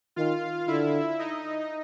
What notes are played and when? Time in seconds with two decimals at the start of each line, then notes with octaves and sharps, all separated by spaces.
0.16 D#3 F4 F5
0.68 D3 E4 E5
1.19 D#4 D#5